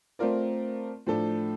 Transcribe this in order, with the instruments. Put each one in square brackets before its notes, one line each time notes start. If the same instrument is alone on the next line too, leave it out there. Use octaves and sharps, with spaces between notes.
[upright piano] A3 C4 F4 A#4 D5
A2 F3 A3 D4 A4